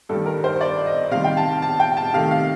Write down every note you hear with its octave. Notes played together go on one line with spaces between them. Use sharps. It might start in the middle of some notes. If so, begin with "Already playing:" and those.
G2 D#3 G3 A4
A#4
C5
D5
D#5
C3 D#3 G3 F5
G5
A5
A5
G5
A5
C3 D#3 A3 F5
F5